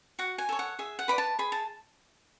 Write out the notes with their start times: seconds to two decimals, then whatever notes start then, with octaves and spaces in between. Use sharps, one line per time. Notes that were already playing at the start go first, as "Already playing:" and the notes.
0.19 F#4 F#5
0.38 G#5
0.49 A4 C#5
0.59 F#5
0.79 G#4 E5
0.99 F#5
1.08 B4 D5 B5
1.18 A5
1.39 G#4 B5
1.52 A5